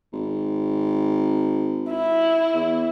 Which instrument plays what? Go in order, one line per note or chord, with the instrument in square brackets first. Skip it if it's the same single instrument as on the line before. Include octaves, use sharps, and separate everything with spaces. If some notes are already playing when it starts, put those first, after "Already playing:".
[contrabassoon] G#1
[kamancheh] E4
[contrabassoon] E2